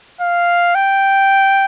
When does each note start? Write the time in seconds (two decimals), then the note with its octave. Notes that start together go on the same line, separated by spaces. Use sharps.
0.21 F5
0.75 G5